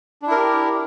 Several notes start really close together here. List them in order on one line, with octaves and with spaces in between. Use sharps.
D4 E4 A#4 G4